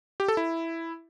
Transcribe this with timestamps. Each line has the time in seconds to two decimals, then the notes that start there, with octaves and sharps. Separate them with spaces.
0.20 G4
0.28 A4
0.37 E4